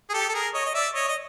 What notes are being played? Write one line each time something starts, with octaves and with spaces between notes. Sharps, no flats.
G#4
G4 A4
A4
G#4 A#4
C#5 D#5
D#5
D5 E5
C#5 D#5
D#5